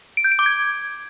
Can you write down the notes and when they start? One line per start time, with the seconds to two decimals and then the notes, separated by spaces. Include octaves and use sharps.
0.17 D7
0.24 G6
0.32 D7
0.39 D6
0.46 G#6